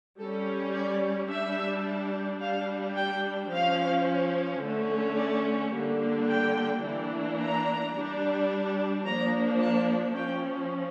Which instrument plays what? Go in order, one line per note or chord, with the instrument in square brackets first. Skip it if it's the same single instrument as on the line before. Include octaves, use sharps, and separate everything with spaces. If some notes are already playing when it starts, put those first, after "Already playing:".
[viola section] G3 C#4 A4
D5
G3 D4 E5
G3 D4 F5
G5
F3 C#4 F5
D3 A3 C#4
D5
D3 G3 A#3 D4
G5
E3 A#3 D4
A#5
G3 D4
F3 A#3 D4 A#5
A5
F3 C#4 G5